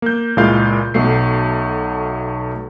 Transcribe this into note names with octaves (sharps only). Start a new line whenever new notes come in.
A#3 G6
C#2 A#2 G#3 E4 F5 G6
B1 B2 A3 C7